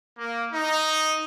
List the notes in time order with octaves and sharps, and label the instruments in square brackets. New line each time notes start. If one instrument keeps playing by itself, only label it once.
[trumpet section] A#3
D#4